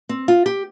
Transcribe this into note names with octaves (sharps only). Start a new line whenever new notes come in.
C4
F4
G4